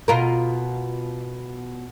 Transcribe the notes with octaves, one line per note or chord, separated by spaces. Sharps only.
B2 F4 A#4